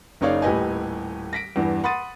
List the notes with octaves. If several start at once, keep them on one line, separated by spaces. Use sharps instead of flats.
F#1 C#3 D#4 C#5 D5 F5
D#1 A2 G4 B4 D#5 G#5
A#6 B6 D7
E2 G2 E3
F#5 B5 C6 D#6 A6 D#7